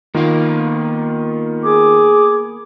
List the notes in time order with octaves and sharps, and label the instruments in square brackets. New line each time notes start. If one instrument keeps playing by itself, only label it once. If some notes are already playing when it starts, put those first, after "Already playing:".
[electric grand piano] D#3 F4 [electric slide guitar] A#3 B3 F5
[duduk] G#4 [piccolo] D6